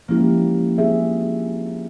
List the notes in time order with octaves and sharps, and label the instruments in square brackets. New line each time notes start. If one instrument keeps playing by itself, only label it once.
[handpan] F3 G#3 C#4 E4 G4 [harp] A#3
[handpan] C4 F4 G#4 E5